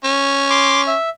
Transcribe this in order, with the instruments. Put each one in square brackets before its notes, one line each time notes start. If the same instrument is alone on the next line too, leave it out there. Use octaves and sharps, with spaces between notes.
[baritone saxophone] C#4
[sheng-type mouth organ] C6 D6
E5